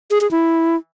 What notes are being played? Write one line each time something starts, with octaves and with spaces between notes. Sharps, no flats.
G#4
G#4
E4